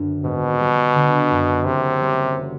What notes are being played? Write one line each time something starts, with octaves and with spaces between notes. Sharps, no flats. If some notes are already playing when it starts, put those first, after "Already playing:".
Already playing: F#2 D3
G#1 B2
G3
D3
F#2
F#1 C3
G3
F#3